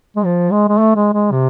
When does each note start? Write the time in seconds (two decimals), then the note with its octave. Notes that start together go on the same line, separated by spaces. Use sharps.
0.16 G#3
0.25 F3
0.52 G#3
0.68 G#3
0.78 A3
0.96 G#3
1.14 G#3
1.31 C3